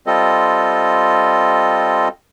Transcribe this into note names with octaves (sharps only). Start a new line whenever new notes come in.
G3 C4 F4 A4 D#5